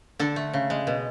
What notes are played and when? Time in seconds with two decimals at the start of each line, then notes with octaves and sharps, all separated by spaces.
0.19 D3 A4
0.36 A3
0.53 C#3
0.70 G#3
0.87 B2